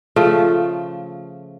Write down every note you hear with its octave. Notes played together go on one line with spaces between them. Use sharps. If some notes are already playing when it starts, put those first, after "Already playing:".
C#3 F3 A3